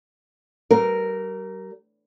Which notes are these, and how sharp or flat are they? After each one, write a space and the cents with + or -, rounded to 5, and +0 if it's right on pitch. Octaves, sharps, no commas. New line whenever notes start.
G3 -40 A#4 +0